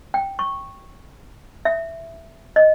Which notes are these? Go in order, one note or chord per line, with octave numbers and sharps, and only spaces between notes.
G5
C#6
E5
D#5